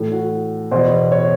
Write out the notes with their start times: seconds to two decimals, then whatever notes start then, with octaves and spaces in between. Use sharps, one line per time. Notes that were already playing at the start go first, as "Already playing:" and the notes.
Already playing: A2 E3
0.12 F#4
0.71 E2 B2 C5
1.12 C#5